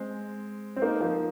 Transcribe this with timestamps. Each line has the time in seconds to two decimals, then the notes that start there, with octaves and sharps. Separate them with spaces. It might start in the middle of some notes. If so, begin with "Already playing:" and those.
Already playing: G#3 C4
0.76 C4
0.82 A#3 D#4
1.00 F3 A#3